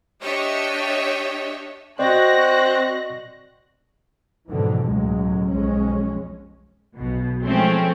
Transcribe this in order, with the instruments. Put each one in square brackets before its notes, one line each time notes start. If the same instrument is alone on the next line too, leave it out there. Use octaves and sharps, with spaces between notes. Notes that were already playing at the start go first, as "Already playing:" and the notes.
[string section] D4 G4 C#5 D#5 E5
[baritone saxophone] C4 [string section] F#4 F#6 A#6 [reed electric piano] D5 D#5
[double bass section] F2 G#2 B2 D3 E3
C#2 A2 F#3 G#3
B1 F2 G#3 C#4
[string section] B1 B2
F3 G#3 A3 C4 C#4